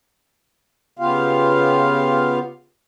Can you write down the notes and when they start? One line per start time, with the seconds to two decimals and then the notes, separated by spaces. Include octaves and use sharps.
0.99 C#3 B3 F4 G4 F5